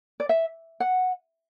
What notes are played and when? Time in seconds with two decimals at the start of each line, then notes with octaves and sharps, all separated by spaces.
0.20 D5
0.29 E5
0.80 F#5